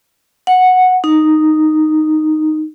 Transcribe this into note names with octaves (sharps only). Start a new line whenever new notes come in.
F#5
D#4